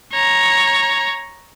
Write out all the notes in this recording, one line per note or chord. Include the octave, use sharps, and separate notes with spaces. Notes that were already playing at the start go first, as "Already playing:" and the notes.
C#5 A#5